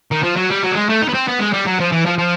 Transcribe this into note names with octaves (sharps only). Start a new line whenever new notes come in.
D#3
F3
F#3
G3
F#3
G3
G#3
A3
D#4
B3
C4
B3
G#3
G3
F#3
F3
E3
F3
F3